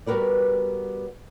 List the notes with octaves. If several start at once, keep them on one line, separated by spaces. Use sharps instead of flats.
G3 B3 F#4 A#4 B4 D5